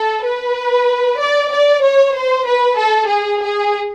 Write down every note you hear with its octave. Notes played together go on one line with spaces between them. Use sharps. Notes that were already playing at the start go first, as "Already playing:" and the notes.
Already playing: A4
B4
D5
D5
C#5
C5
B4
A4
G#4
G#4